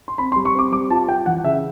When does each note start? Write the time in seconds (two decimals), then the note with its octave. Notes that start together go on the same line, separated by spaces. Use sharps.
0.08 C6
0.18 C4 B5
0.32 C6
0.36 G3
0.45 C#6
0.55 C4 D6
0.72 G3 D6
0.90 F4 A5
1.08 F4 G5
1.26 E3 F#5
1.44 C#3 E5